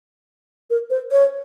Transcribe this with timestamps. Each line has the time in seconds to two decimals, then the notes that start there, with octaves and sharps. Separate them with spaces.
0.70 A#4
0.90 C5
1.11 C#5